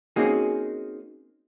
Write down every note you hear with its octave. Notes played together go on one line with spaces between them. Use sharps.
A#3 C4 C#4 D#4 F#4 G#4